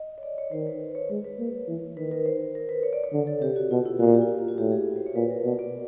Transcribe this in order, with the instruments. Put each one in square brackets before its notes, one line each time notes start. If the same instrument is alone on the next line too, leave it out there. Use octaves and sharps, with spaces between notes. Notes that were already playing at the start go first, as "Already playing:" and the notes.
Already playing: [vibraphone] D#5
C#5
D5
C#5
[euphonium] D#3 [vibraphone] C5
[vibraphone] B4
C#5
[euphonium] G#3 [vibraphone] C#5
[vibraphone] B4
[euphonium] A#3
E3
[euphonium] D#3 [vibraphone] B4
[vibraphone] A#4
C5
A#4
B4
C#5
D5
C#5
[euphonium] D3
[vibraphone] A4
[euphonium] C3 [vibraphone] G4
[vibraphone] F#4
[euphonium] B2 [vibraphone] F4
[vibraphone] E4
[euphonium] A#2 [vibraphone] F#4
[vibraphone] G4
F4
F#4
F4
F#4
[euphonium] A2 [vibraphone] G4
[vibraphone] G#4
C5
C#5
[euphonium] A#2 [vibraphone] B4
[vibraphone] A#4
[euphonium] B2 [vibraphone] D5
[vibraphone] D5